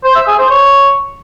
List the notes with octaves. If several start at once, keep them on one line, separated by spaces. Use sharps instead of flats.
C5
E5
G#4
C5
C#5